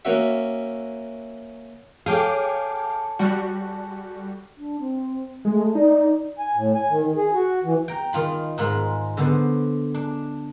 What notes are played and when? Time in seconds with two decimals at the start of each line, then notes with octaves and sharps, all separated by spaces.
0.05 A#3 C#4 F#4 E5
2.06 G#4 A4 C#5 F5 G5 D6
3.19 G3 F#4
4.57 D4
4.79 C4
5.45 G#3 A3
5.75 D#4 D5
6.39 G#5
6.54 A2
6.74 G#5
6.90 D#3
7.03 D#3
7.17 G#4
7.33 F#4
7.64 E3
7.88 G5 A#5
8.13 D#3 F4 B5
8.58 G#2 D#3 G#3 F4 B5
9.17 D3 B3 C5
9.94 D4